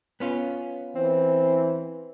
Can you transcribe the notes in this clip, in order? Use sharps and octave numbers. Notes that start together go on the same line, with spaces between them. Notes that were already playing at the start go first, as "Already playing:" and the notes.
B3 C#4 F4
E3 C4